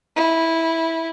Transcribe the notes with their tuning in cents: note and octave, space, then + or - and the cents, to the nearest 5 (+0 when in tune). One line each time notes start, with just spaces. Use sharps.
E4 -10